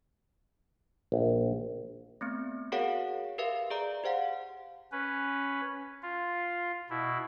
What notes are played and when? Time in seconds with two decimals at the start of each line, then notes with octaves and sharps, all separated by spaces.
1.12 A#1
2.21 A3 B3 C4
2.72 F#4 G#4 A#4 C#5 F5 F#5
3.38 G4 A#4 B4 E5 F5
3.70 G#4 D5 A#5
4.04 G4 C5 F5 F#5
4.92 C#4 B4
6.03 F4
6.90 B2 E4